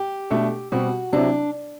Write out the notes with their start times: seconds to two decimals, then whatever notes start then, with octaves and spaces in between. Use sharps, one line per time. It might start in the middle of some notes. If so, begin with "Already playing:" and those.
Already playing: G4
0.30 B2 A3 D4 A4
0.72 B2 G3 C4 F#4 G4
1.13 C3 F#3 C4 D4 E4